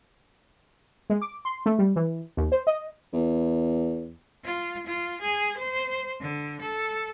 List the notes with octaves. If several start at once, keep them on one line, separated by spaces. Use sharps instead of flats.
G#3
D6
C6
A3
G3
E3
D#2
C5
D#5
E2
F4
F4
G#4
C5
D3
A4